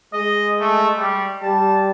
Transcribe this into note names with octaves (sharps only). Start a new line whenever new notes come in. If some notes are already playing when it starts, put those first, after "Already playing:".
G#3 D#5
A3
G3
G3 A5